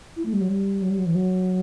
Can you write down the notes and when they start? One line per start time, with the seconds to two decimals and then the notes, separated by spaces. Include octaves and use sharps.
0.16 E4
0.25 A3
0.33 G3
0.41 F#3
0.49 G3
0.82 F#3
0.90 G3
0.98 F#3
1.06 E3
1.14 F#3